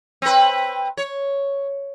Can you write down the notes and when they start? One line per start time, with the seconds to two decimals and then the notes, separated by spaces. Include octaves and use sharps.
0.22 C4 B4
0.97 C#5